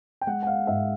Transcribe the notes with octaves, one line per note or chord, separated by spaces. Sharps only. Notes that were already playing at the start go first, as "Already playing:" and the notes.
G5
G#3 F#5
F#5
F5
G#2 E5